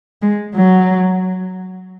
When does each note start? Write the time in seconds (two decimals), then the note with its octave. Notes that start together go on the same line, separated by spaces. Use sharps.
0.22 G#3
0.55 F#3